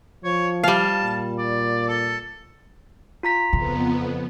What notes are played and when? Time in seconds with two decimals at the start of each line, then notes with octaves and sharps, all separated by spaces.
0.24 F3 C#5
0.64 G3 F5 A5
1.03 A#2
1.38 D5
1.88 A4
3.23 F4 A#5 B6
3.53 F2 C#3 B3